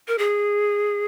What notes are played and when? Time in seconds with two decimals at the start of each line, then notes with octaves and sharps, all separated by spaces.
0.08 A#4
0.18 G#4